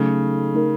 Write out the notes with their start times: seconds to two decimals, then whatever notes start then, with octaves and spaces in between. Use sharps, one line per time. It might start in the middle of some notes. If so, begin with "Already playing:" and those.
Already playing: C#3 F#3 A3 D#4 A4
0.54 A3 D#4 A#4